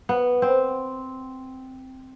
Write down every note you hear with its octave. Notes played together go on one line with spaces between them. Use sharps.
B3
C4